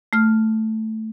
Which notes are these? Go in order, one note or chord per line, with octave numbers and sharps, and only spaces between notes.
A3 F6